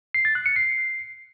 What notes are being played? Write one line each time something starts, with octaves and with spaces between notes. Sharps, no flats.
C7
A6
F#6
C#7
C7